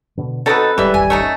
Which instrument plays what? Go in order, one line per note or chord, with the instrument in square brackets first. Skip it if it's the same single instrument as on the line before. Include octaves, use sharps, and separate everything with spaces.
[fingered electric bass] B2 D3
[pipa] B2 F#3 D#4 [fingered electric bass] C4 [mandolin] A4 B4
[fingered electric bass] D1 G#3 [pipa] E3 E5 [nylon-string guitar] G3
[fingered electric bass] D1 G#1 F2 [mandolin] G#5
[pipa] A3 C#4 D#4